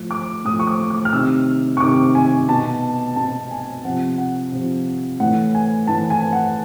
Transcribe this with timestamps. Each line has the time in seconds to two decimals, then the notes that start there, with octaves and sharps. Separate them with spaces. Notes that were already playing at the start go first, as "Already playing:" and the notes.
Already playing: A2 F3
0.11 D6
0.45 A2 F3 D#6
0.59 C#6
0.67 D6
0.90 D6
1.05 F6
1.13 C3 D#3 E6
1.77 C#6
1.80 C3 D#3 D6
2.15 G#5
2.48 B2 A5
3.16 B2 A5
3.51 G#5
3.85 C3 F3 F#5
4.18 F#5
4.53 C3 F3
5.20 A2 E3 F#5
5.55 G#5
5.87 A2 E3 A5
6.10 G#5
6.33 F#5